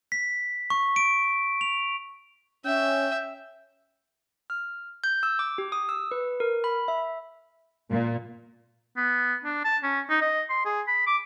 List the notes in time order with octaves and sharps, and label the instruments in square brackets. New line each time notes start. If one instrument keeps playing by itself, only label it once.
[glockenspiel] B6
C#6
D7
F7
[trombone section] C#4 [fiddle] E5 [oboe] G5
[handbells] F6
G6
E6
D6
G4
D#6
E6
B4
A#4
B5
E5
[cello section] A#2
[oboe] B3
D4
A5
C#4
D#4
D#5
C6
G#4
B5
D6